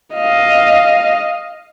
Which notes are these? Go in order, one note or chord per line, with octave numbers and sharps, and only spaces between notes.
D#5 F5